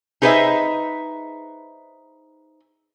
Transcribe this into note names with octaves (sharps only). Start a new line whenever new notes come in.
D#4 G#4 B4 C5 D#5 E5